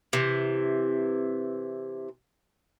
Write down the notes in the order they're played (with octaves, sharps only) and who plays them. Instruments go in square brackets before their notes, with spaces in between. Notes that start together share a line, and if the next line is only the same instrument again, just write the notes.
[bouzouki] C3 E3